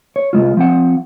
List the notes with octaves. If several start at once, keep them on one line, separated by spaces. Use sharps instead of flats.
C#5
C2 G#2 G#3 F4
F3 C4 F#5